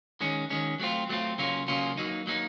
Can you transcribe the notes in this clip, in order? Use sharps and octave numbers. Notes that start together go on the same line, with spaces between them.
D#3 G#3 C#4
D#3 G#3 C#4
F#3 A3 C4 F4
F#3 A3 C4 F4
C#3 F#3 A#3 C#4 F4
C#3 F#3 A#3 C#4 F4
F#3 A#3 D#4
F#3 A#3 D#4